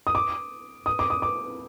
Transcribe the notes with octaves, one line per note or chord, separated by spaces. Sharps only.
D#6
D6
D#6
D6
D#6
D6